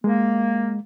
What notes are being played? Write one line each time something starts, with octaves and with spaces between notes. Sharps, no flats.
G#3 A#3